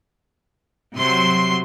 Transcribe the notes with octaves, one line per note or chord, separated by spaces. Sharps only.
C3 F#3 C6